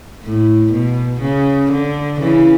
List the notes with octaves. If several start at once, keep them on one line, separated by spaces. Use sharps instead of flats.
A2
B2
C#3
D3
C#3 E3